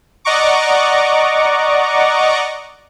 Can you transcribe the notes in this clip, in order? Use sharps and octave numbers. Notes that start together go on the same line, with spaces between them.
D5 D#5 F#5 A#5 C#6 D6